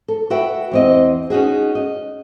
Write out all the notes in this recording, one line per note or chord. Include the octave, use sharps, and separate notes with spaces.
A4
F#4 B4 E5 G5
E2 C4 D#5
C#4 D#4 F#4 G#4
D#5